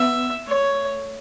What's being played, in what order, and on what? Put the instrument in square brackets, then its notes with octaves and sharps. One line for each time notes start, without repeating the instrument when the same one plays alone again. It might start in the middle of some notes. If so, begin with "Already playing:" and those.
Already playing: [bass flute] B3 [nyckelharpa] E5
[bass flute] A3 [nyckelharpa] C#5